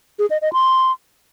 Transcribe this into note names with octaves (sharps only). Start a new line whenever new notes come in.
G#4
D#5
D#5
C6